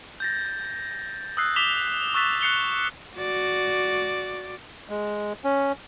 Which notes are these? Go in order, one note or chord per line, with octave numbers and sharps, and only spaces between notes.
G6 A6 A#6
D#6 E6 F#6 C7
D6 B6 E7 F7 G7
C#6 E6 F#6 A6 B6 E7
F#6 C7 C#7 F7 G7
F#4 D5
G#3
C#4